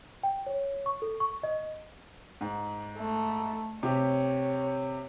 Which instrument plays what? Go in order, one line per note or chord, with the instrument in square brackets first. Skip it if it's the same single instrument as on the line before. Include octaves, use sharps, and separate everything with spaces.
[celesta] G5
C#5
C#6
A4
C#6
D#5
[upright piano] G#2
[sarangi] A3
[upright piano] C3 G4 [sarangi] C#5